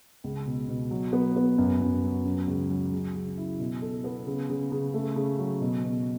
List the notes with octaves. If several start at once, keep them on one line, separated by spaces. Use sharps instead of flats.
C#2
B2
B2
F#3
B3
B3
F#2
F#2
F#3
C#4
C#2
F#3
C#3
C#3
E4
B2
A4
B3
C#3
C#3
C#3
A3
C#3
F#3
B2
B2